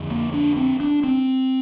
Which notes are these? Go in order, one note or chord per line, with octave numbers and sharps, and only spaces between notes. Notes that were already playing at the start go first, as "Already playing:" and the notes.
Already playing: F2 D3
A#3
D4
C4
D4
C4